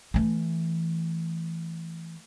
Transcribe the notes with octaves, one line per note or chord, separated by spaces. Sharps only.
E3 A3